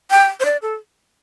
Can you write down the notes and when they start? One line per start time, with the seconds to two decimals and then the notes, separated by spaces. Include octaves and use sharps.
0.11 G5
0.40 C5
0.45 D5
0.62 A4